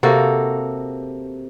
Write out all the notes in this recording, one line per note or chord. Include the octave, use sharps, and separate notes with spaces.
C3 A#3 F#4 A4